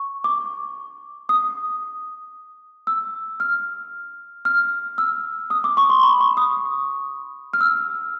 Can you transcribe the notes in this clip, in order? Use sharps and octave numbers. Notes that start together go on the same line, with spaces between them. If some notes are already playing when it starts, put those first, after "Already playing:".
Already playing: C#6
D6
D#6
E6
F6
F6
E6
D#6
D6
C#6
C6
B5
C#6
D#6
F6
E6